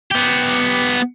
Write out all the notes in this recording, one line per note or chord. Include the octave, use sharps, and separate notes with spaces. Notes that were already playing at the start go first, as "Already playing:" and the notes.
B3 G4